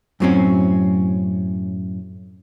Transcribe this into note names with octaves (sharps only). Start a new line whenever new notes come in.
F#2 A2 F#3 A#3 C4 C#4